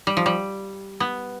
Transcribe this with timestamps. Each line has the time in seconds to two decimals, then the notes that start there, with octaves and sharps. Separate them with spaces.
0.07 G3
0.17 F3
0.26 G3
1.00 B3